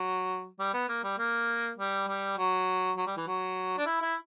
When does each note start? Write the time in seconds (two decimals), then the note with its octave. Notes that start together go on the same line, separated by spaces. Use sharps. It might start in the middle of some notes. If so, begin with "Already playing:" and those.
Already playing: F#3
0.59 G3
0.73 B3
0.89 A#3
1.03 G3
1.18 A#3
1.78 G3
2.08 G3
2.37 F#3
2.97 F#3
3.07 G3
3.17 E3
3.27 F#3
3.78 D4
3.86 E4
4.02 E4